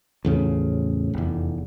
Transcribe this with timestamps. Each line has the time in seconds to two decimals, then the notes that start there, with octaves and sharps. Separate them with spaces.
0.25 A1 E2 C#3 F3
1.14 F1 E2